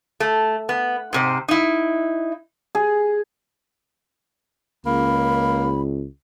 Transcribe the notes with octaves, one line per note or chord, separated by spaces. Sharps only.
A3
B3
G#2 C3 C5
D#4 E4
G#4
C#2 A#3 B5